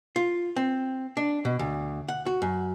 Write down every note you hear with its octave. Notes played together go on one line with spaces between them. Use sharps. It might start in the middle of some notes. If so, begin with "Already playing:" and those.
F4
C4
D4
B2
D2
F#5
F#4
F#2